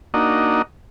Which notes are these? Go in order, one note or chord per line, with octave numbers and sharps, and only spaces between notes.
A#3 D4 D#4 F#4 D#5